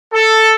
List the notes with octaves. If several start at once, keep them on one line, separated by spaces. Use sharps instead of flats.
A4